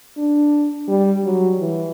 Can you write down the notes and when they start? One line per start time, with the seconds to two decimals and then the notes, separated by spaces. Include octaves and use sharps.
0.17 D4
0.88 G3
1.24 F#3
1.59 E3